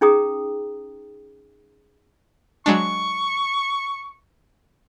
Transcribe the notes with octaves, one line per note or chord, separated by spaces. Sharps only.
C#4 D#4 G#4 G5 A#5 D#6
F#3 G#3 D4 C#6